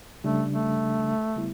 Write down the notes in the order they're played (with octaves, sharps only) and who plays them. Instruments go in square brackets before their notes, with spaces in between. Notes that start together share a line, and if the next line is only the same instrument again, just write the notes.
[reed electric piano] C#3 G3 D4 [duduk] A3
[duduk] A3
[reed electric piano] C#3 G3 B3 E4